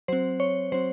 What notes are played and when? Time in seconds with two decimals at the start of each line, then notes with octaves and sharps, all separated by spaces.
0.08 F#3 C4 C5
0.40 C#5
0.72 F#3 C4 C5